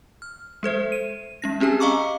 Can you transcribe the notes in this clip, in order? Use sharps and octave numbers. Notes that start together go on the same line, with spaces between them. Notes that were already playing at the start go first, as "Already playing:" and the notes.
F6
G#3 A4 C5 E5
D#7
G#3 C#4 A#6
C4 C#4 G4 G#4 G#5
D#5 F5 A#5 C#6 D6